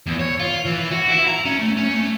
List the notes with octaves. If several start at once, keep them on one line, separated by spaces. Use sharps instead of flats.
E2
C#5
F4
E3
F#4
E4
A#5
C#4
A3
C#4
A3